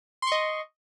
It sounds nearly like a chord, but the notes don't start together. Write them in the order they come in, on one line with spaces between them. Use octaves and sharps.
C6 C#6 D#5